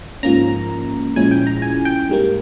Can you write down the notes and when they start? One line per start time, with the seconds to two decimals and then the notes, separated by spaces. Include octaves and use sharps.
0.23 G#2 F3 A#3 C#4 A#5
1.16 A#2 F3 G#3 C#4 E4 G#5
1.31 G5
1.47 A#5
1.62 G#5
1.85 G5
2.09 G#2 G3 A#3